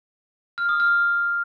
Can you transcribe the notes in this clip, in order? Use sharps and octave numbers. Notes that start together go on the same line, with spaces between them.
F6
D#6
F6